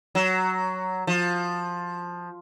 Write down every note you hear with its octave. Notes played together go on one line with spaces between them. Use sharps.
F#3
F3